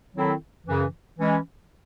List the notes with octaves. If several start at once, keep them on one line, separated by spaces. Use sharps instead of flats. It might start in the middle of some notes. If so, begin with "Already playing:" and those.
D#3 F#3 C4 E4 A4
F#2 C#3 E3
E3 G#3 C#4